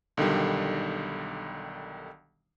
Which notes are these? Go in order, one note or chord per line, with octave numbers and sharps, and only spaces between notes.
B1 D3 D#3 G3